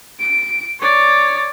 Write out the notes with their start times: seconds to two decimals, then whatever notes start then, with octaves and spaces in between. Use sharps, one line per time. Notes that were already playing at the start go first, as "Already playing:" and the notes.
0.20 D7
0.80 C#5 D5